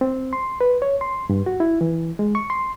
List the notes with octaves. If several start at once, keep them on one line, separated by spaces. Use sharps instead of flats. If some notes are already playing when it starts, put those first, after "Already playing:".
C4
C6
B4
C#5
C6
G2
F#4
E4
E3
G#3
C#6
C6